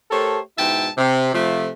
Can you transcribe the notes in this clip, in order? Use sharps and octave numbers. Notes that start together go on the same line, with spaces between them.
A3 G4 A4 A#4 C5 C#5
G#2 B2 E4 E5 G5 A5
C3
C3 F3 A3